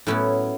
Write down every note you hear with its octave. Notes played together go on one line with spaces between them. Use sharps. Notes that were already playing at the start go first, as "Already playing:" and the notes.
A2 F#3 B3 C#4 E4